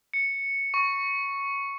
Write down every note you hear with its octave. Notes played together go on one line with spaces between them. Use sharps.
C#7
C#6